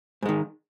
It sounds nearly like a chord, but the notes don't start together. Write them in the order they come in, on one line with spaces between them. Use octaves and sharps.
G#2 G#3 D#3